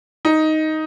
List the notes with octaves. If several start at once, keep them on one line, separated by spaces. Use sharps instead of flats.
D#4